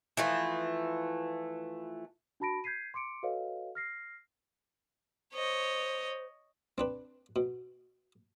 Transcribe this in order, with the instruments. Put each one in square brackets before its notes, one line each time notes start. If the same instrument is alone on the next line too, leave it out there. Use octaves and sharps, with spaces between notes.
[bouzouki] E3 F3 A3
[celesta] D4 F#4 A5 B5 A#6 D7
G6 G#6 B6 C7 D#7
C6 D6 C#7 D7
F#4 A4 B4 C#5 D#5 F5
F6 A#6 C7
[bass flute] C5 [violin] C#5 D#5
[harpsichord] C4 D4 B4
B2